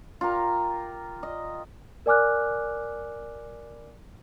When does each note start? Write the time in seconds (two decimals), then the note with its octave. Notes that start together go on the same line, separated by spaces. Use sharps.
0.21 F4 G4 A#4
1.23 D#5
2.06 A#4 D5 G#5 D6 F6 F#6